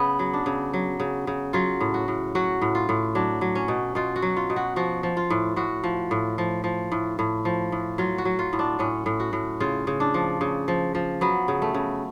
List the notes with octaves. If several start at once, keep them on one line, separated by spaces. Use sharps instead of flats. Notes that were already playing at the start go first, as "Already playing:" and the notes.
Already playing: C#3 B3
F#3
D4
C#3
F#3
C#3
C#3
F#3 F4
A2
F#4
A2
F#3 F#4
A2
F4
A2
F#3 D4
F#3
C#4
B2
B2 F4
F#4
F#3
F4
B2
F#4
F3 F#4
F3
F4
A2
A2 F#4
F3
A2
F3
F3
A2
A2
F3
A2
F#3 F4
F#4
F#3
F4
A2
D4
A2 C#4
A2
F#4
A2
C#3 F4
C#3
D4
F3
C#3
F3
F3
F#3 B3
C#3
A3
C#3